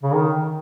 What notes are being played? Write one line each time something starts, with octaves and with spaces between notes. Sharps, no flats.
C#3
D#3